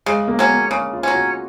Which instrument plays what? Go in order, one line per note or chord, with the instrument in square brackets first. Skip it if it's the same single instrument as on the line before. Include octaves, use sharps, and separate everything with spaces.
[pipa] C#3 [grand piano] G#3
[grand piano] A#3
[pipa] F#3 C#4
[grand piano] A#3
[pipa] C#3 [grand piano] C#4
[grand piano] F4
[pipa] F#3 C#4
[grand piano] F#4